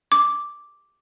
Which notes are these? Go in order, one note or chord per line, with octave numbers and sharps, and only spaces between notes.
D6